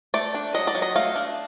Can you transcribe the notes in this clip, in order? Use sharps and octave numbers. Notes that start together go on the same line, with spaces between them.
A3 D5
D4
F#3 D#5
D5
F#3
D#5
A3 F5
D4